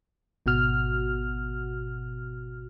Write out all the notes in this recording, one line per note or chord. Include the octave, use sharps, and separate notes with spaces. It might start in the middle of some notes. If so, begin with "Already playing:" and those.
G#1 B2 F#4 F6